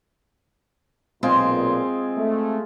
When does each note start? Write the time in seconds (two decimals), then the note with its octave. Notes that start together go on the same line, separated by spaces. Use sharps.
1.23 B1 A#2 G#3 C4 F4 G#4
2.16 A3